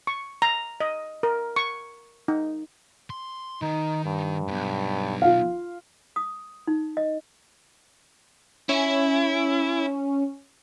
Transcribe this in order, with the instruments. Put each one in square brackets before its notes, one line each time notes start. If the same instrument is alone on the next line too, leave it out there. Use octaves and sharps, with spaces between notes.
[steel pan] C#6
A#5
D#5
A#4
C#6
D#4
[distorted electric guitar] C6
[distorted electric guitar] D#3 [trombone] D#4
[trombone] G2
[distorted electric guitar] B1 F#2
[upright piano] F4 F5
[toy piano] D#6
D#4
D#5
[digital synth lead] C#4 [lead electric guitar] E4